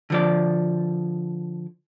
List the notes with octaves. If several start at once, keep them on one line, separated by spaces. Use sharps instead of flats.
D3 F3 D5